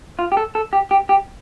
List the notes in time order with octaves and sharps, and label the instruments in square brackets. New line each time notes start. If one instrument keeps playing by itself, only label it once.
[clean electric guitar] F4
G4
A4
A4
G4
G4
G4